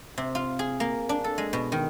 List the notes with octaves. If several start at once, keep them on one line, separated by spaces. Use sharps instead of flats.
C3
F4
G#4
A#3
D4
A4
G#3
B2
D#3